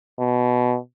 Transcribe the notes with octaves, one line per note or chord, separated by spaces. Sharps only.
B2